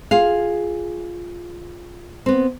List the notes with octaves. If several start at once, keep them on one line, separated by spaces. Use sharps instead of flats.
F4 G#4 F5
B3 C4